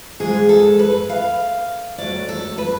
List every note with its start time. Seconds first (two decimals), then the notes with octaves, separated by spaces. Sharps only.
0.20 G#2 F3 G#3 G#4
0.49 A4
0.79 B4
1.09 F5
1.98 G#2 F#3 A3 D5
2.29 A4
2.58 B4